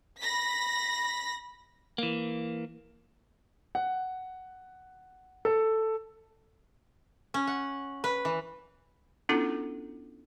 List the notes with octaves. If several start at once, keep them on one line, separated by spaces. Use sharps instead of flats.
B5 A#6 B6
E3 A#3
F#5
A4
C#4
F#5
B4
E3
B3 C#4 D4 E4 F4 A4